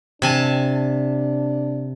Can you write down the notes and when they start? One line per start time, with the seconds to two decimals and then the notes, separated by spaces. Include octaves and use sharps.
0.22 C3 D4 G#5 A5